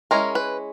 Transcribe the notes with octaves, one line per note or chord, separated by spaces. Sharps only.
G#3 C#4 E4 A#4
B4